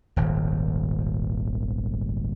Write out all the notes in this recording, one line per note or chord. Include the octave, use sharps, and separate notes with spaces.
D#1 G#1